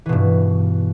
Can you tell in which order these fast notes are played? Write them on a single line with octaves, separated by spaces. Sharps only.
E3 B2 G2